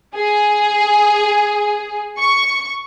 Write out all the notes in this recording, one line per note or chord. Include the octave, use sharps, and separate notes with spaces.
G#4
C#6